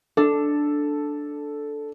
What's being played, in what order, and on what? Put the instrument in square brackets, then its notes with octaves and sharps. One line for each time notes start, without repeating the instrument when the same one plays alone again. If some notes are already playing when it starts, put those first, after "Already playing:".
[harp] D4 [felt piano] A4